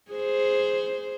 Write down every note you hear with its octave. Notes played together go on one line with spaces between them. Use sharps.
G#4 C5